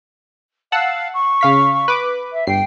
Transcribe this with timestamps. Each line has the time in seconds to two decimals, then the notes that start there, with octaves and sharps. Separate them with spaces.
0.72 F5 F#5 A5 E6
1.14 C#6
1.41 C#3 F5 B6
1.88 B4 D6
2.32 E5
2.47 G1 G5 C7